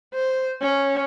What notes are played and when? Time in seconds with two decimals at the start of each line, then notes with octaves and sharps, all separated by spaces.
0.14 C5
0.61 C#4